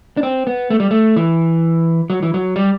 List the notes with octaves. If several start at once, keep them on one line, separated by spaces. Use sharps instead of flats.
D4
C4
B3
A3
G3
A3
E3
F#3
E3
F#3
G3